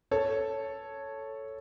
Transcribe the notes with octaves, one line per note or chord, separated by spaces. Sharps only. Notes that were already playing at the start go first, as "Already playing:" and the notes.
A4 C#5